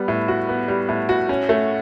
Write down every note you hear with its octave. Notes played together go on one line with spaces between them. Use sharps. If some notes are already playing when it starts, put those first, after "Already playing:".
Already playing: G3 B3
A2
F#4
B3
G3
A2
F#4
C#4
A3